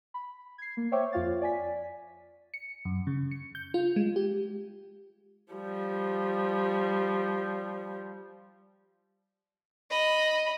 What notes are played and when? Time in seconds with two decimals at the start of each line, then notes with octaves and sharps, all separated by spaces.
0.14 B5
0.58 G#6 C7
0.77 A#3
0.92 C5 C#5 E5 G5 C#6 D6
1.12 F2 F4 F5 A6
1.41 D5 G#5 B6
2.54 C#7
2.85 F#2
3.07 C#3
3.31 C#7
3.55 G6
3.74 F4
3.96 G#3
4.16 G4
5.53 F3 G3
9.90 D#5 B5